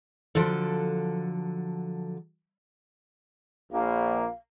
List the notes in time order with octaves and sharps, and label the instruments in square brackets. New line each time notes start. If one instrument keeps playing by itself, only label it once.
[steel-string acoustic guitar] D3 F3 F#3 A4
[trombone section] A#1 A#3 [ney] F5